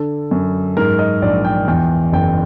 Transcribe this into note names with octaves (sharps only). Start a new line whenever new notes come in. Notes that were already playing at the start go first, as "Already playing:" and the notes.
Already playing: D3 A4
F#2
G#2 A#4
D#5
A#1 D5
G5
E2 G5
F#1 G5